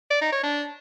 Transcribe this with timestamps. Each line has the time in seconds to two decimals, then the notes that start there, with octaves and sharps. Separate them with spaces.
0.11 D5
0.21 D#4
0.32 C#5
0.43 D4